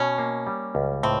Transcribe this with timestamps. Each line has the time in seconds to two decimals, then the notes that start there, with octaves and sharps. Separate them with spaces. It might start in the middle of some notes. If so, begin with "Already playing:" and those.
Already playing: B2 C#4
0.18 A#3
0.47 G3
0.75 C#2
1.03 A2 C4